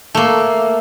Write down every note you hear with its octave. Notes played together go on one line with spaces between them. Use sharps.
A3 A#3